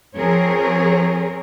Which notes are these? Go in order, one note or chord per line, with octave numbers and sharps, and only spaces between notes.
F3 C4 G#4 A#4 C#5